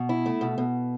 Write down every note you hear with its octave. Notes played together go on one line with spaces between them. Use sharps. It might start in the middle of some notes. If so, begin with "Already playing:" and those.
Already playing: B2
E4
A3
B2
B2